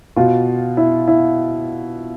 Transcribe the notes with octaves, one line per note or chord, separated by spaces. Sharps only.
B2 F4
E4
E4